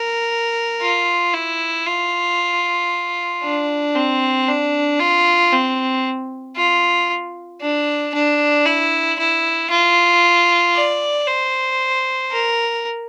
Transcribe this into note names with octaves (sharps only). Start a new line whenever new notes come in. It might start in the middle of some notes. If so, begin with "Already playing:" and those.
Already playing: A#4
F4
E4
F4
D4
C4
D4
F4
C4
F4
D4
D4
E4
E4
F4
D5
C5
A#4